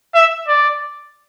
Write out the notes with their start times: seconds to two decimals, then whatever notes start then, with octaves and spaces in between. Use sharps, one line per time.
0.15 E5
0.48 D5